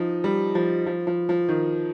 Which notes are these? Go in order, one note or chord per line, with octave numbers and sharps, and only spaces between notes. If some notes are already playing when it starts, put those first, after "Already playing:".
Already playing: F3 D#4
G3
F3
F3
F3
F3
D#3